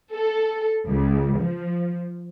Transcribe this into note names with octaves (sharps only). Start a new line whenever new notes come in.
A4
C#2
F3